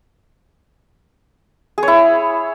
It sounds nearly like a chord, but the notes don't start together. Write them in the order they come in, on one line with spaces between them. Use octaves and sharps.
G#4 C#5 E4